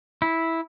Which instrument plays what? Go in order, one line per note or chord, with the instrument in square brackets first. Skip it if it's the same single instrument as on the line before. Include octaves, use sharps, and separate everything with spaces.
[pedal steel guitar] E4